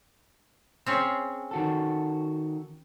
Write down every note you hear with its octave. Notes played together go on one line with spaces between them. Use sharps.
C4 C#4 G#4
D#3 F#4 A4